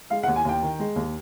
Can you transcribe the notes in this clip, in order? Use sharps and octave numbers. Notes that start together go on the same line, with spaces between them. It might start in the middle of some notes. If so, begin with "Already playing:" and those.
G#3 F5
F#5
D#2
G#5
D#2 G5
D#3
G#3
D#2